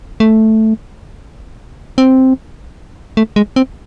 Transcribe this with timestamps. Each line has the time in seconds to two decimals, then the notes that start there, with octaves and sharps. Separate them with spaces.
0.20 A3
1.98 C4
3.17 A3
3.36 G#3
3.56 C4